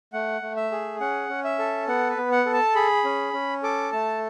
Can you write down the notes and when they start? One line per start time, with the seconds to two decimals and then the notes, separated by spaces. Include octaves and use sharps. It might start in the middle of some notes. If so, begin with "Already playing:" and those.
0.13 A3 F#5
0.42 A3
0.56 E5
0.71 G#4
1.00 C#4 F#5
1.29 C#4
1.44 E5
1.59 A4
1.88 B3 F#5
2.09 B4
2.17 B3
2.32 F#5
2.46 A4
2.54 A5
2.75 G#4 B5
3.04 C#4
3.33 C#4
3.63 A4 D6
3.93 A3 A5